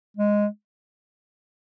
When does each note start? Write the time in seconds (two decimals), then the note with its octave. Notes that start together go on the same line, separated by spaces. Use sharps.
0.17 G#3